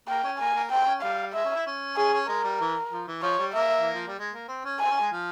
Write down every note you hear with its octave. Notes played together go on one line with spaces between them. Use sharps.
A#3 G5
C#4
A#3 G#5
A#3
C4 G5
C#4
G3 F5
G#3 E5
C#4
E4
C#4
C#4 G#4
C#4
G#3 A#4
G3
E3
F3
E3
F3 C#5
G3
A#3 E5
E3
F3
G3
G#3
A#3
C4
C#4
G#5
C4
C#4
G#3
F3